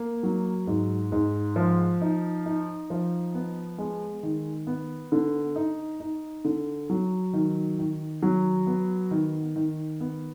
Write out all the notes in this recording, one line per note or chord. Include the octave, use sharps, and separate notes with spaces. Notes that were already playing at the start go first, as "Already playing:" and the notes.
Already playing: A#3
F#3
G#2
G#2
F3
D#4
D#4
F3
B3
G#3
D#3
B3
D3
D#4
D#4
D3
F#3
D#3
D#3
F#3
B3
D#3
D#3
B3